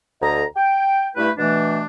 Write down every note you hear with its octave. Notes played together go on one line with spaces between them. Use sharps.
D2 A4 D#5 A#5
G5
G2 A3 E4 B4
B2 E3 A3 D4